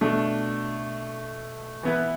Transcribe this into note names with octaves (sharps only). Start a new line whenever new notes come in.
B2 A3 D4
E3 B3 E4 B4